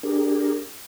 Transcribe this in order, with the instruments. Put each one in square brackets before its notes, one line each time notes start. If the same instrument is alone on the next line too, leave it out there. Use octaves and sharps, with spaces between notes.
[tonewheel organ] D4 G4 G#4 A#4